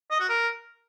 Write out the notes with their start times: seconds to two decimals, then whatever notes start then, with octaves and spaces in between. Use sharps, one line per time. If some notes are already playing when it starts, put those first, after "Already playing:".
0.10 D#5
0.20 F#4
0.29 A#4